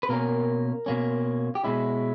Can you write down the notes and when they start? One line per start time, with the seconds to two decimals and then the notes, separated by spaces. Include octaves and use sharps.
0.03 B4
0.09 B2 A#3 C#4 A#4
0.86 B2 A#3 C#4
1.55 G4
1.64 B2 G#3 C#4 E4